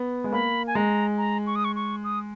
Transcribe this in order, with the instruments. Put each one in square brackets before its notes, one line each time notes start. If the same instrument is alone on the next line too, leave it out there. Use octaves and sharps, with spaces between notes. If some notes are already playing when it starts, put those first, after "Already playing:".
Already playing: [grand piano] B3
G#3
[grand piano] A#3 [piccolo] B5
[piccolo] G#5
[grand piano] G#3 [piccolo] A#5
[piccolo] A#5
C#6
D#6
C#6
C#6
D#6